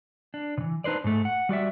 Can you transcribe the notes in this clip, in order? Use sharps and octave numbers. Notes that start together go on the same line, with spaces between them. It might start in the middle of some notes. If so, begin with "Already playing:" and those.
D4
C3 E3
D4 D#4 B4 C5 D5
G#2 A3
F#5
G3 F#4 D5 E5